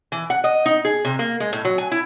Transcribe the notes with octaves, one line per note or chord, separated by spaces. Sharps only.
E3
F#5
D#5
D#4
G#4
C3
A#3
G#3
A2
F#3
G#5
E4